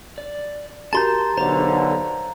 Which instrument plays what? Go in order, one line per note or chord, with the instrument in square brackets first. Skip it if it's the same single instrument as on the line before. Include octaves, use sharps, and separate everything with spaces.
[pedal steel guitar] D5
[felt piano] F#4 G4 A#4 [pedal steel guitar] A5 C6 G6 [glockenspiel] A#5 A6
[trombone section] B1 D3 [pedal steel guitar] C5 F5 [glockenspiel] A#5